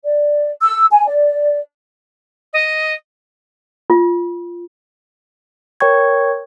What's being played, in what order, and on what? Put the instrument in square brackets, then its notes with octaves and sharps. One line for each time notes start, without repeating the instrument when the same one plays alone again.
[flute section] D5
E6
G#5
D5
[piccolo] D#5
[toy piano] F4
[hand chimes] A#4 C#5 G5 C#6 G#6